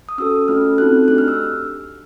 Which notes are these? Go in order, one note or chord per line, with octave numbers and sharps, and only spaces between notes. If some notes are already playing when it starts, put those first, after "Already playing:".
D#6
C#4 F#4 A4 E6
A3 C#4 F4 A4 F6
C4 D#4 F#4 A4 F#6
A3 D4 G4 F#6
F6
E6